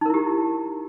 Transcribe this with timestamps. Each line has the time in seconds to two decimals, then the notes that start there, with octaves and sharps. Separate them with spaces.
0.01 D#4
0.06 A#4
0.10 E4
0.14 G4